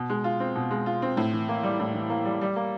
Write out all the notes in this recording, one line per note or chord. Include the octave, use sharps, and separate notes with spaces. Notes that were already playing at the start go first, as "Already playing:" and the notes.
Already playing: B2
G#3
F4
C4
B2
G#3
F4
C4
A2
E3
A#3
G3
A2
E3
A#3
G3
G3
A#3